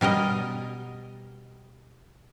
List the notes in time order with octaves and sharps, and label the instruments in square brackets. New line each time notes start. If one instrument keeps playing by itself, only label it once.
[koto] B2 G3 A#4 D#5